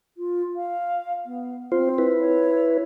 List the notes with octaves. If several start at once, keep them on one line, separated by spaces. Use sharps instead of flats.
F4
F5
B3
C4 F4 C5
E4 B4
C#5